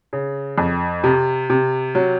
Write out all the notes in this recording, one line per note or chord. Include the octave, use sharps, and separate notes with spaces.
C#3
F2
C3
C3
F#3